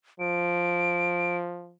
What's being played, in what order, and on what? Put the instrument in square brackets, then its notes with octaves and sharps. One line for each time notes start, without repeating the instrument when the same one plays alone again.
[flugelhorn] F3 [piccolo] D7